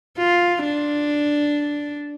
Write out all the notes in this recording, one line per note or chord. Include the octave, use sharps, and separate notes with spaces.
F4
D4